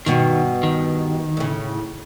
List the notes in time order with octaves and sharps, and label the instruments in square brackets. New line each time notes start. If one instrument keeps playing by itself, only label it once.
[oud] G2 B2 F#4 [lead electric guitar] D#3
[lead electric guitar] D#3
[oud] A2 C#3